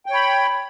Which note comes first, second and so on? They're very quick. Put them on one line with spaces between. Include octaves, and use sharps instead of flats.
G5 C#5 B5